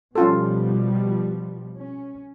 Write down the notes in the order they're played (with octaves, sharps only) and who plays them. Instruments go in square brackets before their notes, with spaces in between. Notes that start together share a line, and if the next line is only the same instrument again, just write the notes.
[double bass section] B2 F3 G3 [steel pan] C#4 F4 A4
[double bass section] C#4